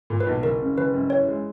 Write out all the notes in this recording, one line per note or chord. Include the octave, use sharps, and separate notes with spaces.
A#2
B4
B1
F#1 A#4
C#3
F#1 B4
F#2
E3 C#5
G#3